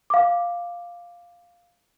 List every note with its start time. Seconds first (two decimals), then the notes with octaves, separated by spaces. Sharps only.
0.10 F5 D6